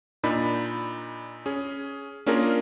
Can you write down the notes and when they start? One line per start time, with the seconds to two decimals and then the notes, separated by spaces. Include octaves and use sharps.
0.24 A#2 D4 D#4 B5
1.46 C#4 G#4
2.26 A#3 C#4 D4 F4 G#4 A#4